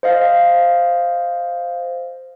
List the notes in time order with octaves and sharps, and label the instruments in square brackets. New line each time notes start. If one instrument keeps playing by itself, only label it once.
[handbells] C5 D#5 F5